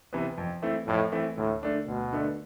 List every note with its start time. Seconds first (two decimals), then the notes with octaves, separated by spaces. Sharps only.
0.13 C3 E3 B3
0.38 F2
0.62 E3 A3 C4 E4
0.87 F2 A2
1.12 E3 A3 C4 E4
1.37 D2 A2
1.63 D3 A3 D4
1.88 D2 B2
2.13 D3 A3 D4